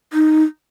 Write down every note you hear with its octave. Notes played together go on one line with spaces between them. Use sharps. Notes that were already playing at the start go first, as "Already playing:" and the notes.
D#4